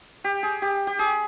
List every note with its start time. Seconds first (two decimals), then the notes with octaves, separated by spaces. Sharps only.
0.24 G4
0.43 G#4
0.62 G4
0.87 G4
0.99 G#4